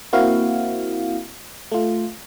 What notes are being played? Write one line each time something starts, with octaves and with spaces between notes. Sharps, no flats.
A#3 C4 E4 F#4 F5
A3 F4